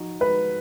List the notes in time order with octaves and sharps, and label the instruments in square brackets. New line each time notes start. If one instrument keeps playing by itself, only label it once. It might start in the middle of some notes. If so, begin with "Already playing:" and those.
Already playing: [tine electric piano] F3 D#4 F#4
[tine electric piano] G#3 [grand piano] B4